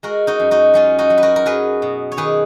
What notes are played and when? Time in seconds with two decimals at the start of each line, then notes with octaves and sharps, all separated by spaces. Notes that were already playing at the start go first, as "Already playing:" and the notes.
0.03 G#3 F#4 A#4
0.27 D#4 F#4
0.40 F#2
0.51 D#4 F#4
0.74 F#3 C#4 F4
0.98 D#4 F#4
1.10 F#3
1.18 B4
1.23 F#4 A#4
1.36 A#4
1.46 F#3 G#4 B4
1.82 B2
2.12 C#5
2.17 D#3 G#4 B4